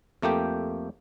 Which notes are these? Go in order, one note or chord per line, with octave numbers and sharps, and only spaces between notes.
F2 A3 A#3 G4 G5